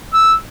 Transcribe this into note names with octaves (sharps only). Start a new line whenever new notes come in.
E6